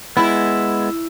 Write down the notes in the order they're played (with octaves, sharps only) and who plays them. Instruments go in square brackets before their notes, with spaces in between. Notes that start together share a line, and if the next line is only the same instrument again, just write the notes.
[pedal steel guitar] G#3 B3 [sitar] E4